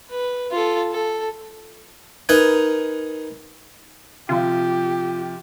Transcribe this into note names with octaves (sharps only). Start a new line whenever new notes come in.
B4
F4 A4
A4
D#4 A#4 B4 G#5
C3 F3 F4 G4